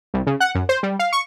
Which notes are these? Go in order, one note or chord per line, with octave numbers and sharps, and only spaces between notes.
C2
C#3
F#5
F#2
C5
G3
F5
C#6